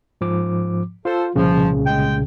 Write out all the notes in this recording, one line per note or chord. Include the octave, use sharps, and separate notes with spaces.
G#2 F3 D6
F4 A4 C5
C2 A#2 C#3 F3
G#3 G5